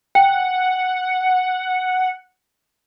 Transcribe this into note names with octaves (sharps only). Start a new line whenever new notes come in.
F#5 G5